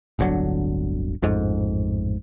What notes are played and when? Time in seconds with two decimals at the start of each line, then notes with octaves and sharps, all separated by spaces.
0.19 D1 G1 D3 F#3
1.22 A1 F2 G#2